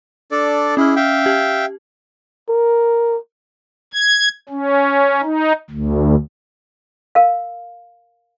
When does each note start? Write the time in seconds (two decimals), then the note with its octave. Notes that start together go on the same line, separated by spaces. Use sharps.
0.31 D4 A4 D5
0.77 C#4 E4 G#4 F6
0.96 E5 F5 G5
1.26 G4
2.49 A#4
3.93 G#6
4.49 C#4
5.23 D#4
5.70 D2
7.15 A#4 F5